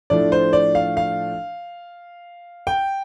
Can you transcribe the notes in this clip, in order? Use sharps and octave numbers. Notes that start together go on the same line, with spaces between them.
A2 F3 A3 D4 D5
C5
D5
F5
F5
G5